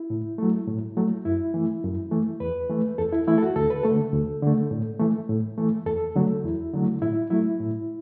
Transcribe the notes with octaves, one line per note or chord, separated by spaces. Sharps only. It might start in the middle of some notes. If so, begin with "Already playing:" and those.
Already playing: E4
A2
F#3 A3
A2
F#3 A3
F#2 E4
E3 A3
F#2
E3 A3
E2 B4
E3 A3
E2 A4
E4
E3 A3 E4
A4
F#4
D2 A4
B4
A3 A4
D3
D2
D3 A3
A2
E3 A3
A2
E3 A3
E2 A4
D3 F#3 A3
E2 E4
D3 F#3 A3
A2 E4
F#3 A3 E4
A2